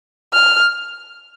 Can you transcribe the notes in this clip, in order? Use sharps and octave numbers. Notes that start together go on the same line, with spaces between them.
F6